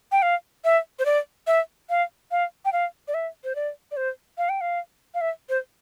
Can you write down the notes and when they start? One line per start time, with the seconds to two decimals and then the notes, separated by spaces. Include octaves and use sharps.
0.12 G5
0.22 F5
0.64 E5
0.99 C5
1.05 D5
1.47 E5
1.90 F5
2.31 F5
2.65 G5
2.73 F5
3.08 D5
3.14 E5
3.44 C5
3.55 D5
3.91 D5
3.97 C5
4.38 F5
4.49 G5
4.61 F5
5.14 F5
5.21 E5
5.49 C5